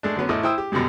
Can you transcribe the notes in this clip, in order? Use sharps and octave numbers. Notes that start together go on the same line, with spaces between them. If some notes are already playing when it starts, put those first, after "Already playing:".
G#3 A3 D4
D3 F#3 B3 C#4
A1 A3 E4 D#5 D6
E4 C5 G5 D#6 E6
G4
F#2 B2 D3 G3 G#3